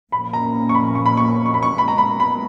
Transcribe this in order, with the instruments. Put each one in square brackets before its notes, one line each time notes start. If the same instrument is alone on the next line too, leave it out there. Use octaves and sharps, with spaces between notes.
[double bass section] A#2 F3 A#3 C#4 [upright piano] B5
[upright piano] A#5
C#6
B5
C#6
B5
C#6
C#6
B5
C#6
[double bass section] A#2 G#3 B3 [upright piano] B5
[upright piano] A#5
B5
B5